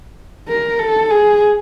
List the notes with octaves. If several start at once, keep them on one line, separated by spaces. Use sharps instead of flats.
A#4
A4
G#4